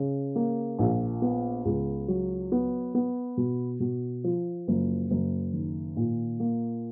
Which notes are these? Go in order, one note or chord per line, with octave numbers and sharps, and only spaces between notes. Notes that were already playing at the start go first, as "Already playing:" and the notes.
Already playing: C#3
A#3
A#1
B3
C#2
F#3
B3
B3
B2
B2
F3
F#1
F#1
D#3
A#2
A#3